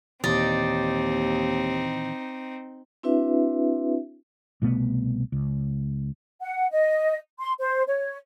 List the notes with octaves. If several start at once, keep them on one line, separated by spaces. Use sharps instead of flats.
D#2 A#2 D#3 E3 C4 D#4 D5 D#5
C4 D4 E4 F#4 B4 E5
C2 B2 A3 B3
C#2
F#5
D#5
C6
C5
C#5